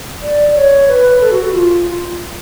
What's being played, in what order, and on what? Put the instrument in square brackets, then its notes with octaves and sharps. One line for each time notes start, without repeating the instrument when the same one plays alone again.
[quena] D5
C#5
B4
A4
F#4
F4